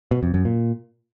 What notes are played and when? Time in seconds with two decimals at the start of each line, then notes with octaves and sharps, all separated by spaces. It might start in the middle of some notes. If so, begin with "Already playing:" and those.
0.11 B2
0.23 F2
0.34 F#2
0.45 A#2